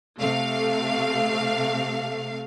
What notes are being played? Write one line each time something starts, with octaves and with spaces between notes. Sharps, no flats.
C3 A3 F5